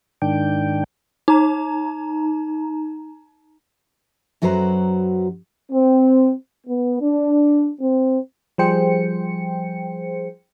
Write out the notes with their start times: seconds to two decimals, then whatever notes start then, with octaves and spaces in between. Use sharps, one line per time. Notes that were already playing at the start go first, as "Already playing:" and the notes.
0.22 G#2 D#3 D4 G5
1.28 D#4 A#5
4.42 F#2 F#3 F#4 B4 C5 A#5
5.72 C4
6.67 B3
7.01 D4
7.80 C4
8.58 F3 G3 G#4 C5 G5 C#7